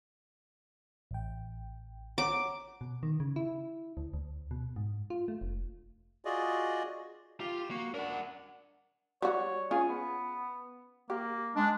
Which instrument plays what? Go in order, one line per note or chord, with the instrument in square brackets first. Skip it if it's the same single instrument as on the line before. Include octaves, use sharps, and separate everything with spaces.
[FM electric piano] A1 G5
[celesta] C#5 F#5 A#5 [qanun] D6
[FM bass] B2
D#3
C#3
E4
D2
D2
B2
G#2
F4
A3
F1
[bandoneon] F4 F#4 G#4 D5 D#5
[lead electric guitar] F4 [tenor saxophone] G4
[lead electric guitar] A#3 [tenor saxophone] F#4
[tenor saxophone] D4 [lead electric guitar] A#4 F#5
[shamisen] G3 F#4 [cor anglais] C#5
[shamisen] C#4 F4 C#5 [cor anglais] G#4
[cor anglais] B3
[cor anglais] A#3 [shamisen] G4
[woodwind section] G#3 D4